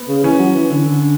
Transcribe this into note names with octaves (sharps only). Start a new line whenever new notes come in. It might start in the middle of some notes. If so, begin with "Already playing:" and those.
Already playing: B3
C#3
E3 C#4
F#3
E3
D3
D3